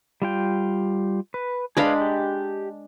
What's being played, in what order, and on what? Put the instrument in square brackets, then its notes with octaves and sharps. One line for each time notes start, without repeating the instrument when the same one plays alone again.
[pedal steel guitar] G3 F4 G5
B4
[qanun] G#3 D4 B5 [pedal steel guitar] G#4 B4 F5
[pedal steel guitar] G4